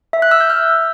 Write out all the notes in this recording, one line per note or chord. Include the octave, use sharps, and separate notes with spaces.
E5
F#6
E6
G6
F6